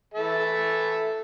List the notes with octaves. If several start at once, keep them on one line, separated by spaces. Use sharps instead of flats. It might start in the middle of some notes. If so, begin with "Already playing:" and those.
E3 A4 E5